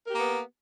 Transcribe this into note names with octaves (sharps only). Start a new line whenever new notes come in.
A#3 B3 G4 A#4